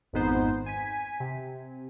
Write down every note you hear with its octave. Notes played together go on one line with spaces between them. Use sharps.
G#1 F2 G#2 B3 D#4 C5
G#5 B6
C3